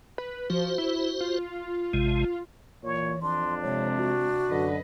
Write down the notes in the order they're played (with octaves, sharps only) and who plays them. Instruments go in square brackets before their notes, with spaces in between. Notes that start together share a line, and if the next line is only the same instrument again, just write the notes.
[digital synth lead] B4
[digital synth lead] F3 [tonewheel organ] F#4 C5
[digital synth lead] E4
F4
[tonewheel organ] A1 C3 G#3
[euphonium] A#2 [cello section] E3 [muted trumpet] C#5
[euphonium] F2 [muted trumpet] D4 [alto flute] C6
[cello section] C3 G#3 [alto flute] C#5
[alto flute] F#4
[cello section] F#2 B4 D#5 [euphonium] D3